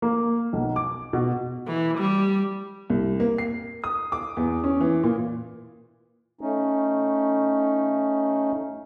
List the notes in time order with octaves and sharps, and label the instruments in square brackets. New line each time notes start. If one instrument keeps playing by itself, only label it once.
[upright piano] A#3
B1
D6
B2
[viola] E3
G3
[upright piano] C2
A#3
C7
D#6
D6
E2
C#4
E3
A#2
[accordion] A3 C#4 D#4